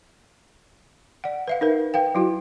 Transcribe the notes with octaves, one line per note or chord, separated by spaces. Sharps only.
D5 F#5
B4 E5 F5
D#4 A#4 B4
B4 F5 G5
F#3 E4 F#4